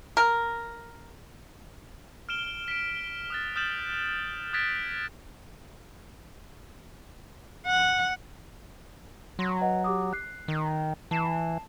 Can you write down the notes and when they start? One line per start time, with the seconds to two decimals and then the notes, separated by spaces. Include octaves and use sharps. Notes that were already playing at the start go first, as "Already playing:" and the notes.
0.17 A#4
2.29 F6 D7 E7 G7
2.68 B6 D7
3.30 D#6 F#6 A6
3.56 D#6 F6 G6 A6 E7 F#7
4.53 D#6 F#6 G#6 A6 B6 D7
7.66 F#5
9.39 F#3 C6 A#6
9.61 B4 D#5 F#5
9.84 G4 D6 D#6
10.13 F#6 C7
10.48 D#3
11.11 E3 A5 C7 E7